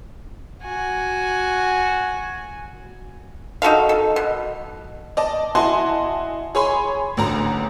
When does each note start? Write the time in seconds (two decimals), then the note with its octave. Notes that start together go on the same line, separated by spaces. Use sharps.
0.64 F#4 G#5
3.62 D#4 F#4 A4 F5
3.89 A4
4.16 B2
5.17 D5 D#5 A5
5.55 E4 F#4 D#5 G#5 A5 C6
6.55 G#4 C#5 G#5 B5 C6
7.17 A1 D2 A#5